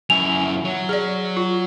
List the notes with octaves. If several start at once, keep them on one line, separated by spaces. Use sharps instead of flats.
F#2 E4 G#5 F7
F#3
G#4 D5
F4